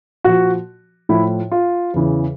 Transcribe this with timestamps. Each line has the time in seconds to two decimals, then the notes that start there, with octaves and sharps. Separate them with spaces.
0.24 A#2 F3 F#4
1.09 A2 F3 E4
1.52 F4
1.94 E2 C#3 E3